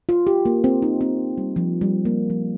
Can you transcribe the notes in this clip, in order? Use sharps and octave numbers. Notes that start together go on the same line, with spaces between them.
F4
G4
A#3
C4
D#4
C4
G3
F3
G3
A#3
F3